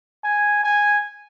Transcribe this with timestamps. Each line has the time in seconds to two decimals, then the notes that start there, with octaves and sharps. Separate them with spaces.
0.24 G#5
0.63 G#5